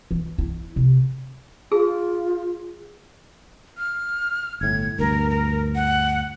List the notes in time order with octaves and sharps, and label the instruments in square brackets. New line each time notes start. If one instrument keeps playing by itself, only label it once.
[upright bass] E3
E4
C3
[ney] F4 [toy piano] G#4
[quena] F6
[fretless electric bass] G1 A2 [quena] G#6
[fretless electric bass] D2 G2 [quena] A#4
[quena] A#4
F#5